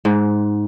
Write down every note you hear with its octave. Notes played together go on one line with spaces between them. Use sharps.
G#2